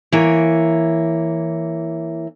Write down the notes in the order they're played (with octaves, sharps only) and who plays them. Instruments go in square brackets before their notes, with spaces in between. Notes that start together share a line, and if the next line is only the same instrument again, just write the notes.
[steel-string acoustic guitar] E3 A#3 C#5